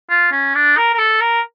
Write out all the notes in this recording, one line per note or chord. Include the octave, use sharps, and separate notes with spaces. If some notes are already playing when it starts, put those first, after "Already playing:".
F4
C#4
D4
A#4
A#4
A4
A#4